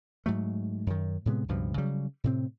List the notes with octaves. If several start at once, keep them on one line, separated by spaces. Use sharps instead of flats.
G#2 F#3 A3
F#2 D#3
A2 C3 G#3 B3
C#2 G2 B2 F3
C#3 F#3 G3
A2 C3 C4